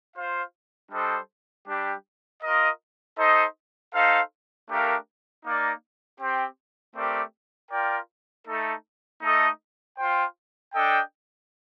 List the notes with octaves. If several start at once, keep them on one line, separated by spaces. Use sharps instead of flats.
F4 C5 F5
G3 D4 A4 C5 D#5
G3 D4 G4
F4 A#4 D#5
D#4 A4 C5 D#5
D#4 A4 C5 F5
A3 D4 G4 A#4 F5
A#3 D#4 A#4 D5 F5
C4 G4 C5 G5
A3 C4 G4 A#4 D5
F4 A#4 D5 G5
A3 D#4 A4
A3 D#4 A4 D#5
F4 C5 G5
D4 A4 D#5 G5